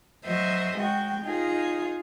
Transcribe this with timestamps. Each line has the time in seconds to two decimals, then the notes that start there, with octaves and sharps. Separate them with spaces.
0.25 F#3 C5 D#5 E5
0.77 G#3 F#4 G5
1.23 D#4 F4 G#4